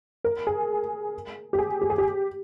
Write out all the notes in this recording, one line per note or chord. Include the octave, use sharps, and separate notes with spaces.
A#4
G#4
G4
G#4
G4
G#4
G4